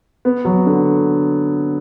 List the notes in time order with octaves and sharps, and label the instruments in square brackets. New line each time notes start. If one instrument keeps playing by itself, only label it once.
[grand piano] B3
F#3
D3